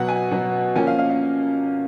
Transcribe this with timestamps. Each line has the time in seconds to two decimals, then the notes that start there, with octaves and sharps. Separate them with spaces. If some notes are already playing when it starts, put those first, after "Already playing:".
Already playing: B2 F#3 B3 F#5
0.08 G#5
0.31 B2 F#3 B3
0.76 F3 A#3 C#4 G#5
0.87 F5
0.98 F5
1.10 F5